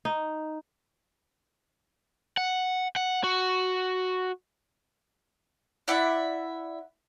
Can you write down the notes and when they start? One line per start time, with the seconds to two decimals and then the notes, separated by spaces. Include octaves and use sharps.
0.05 D#4
2.37 F#5
2.96 F#5
3.24 F#4
5.88 E4 D5 E5 F#5